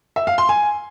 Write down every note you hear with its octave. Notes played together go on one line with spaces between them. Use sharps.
E5
F5
C6
G#5